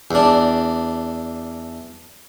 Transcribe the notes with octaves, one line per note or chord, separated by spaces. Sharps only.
E2 D4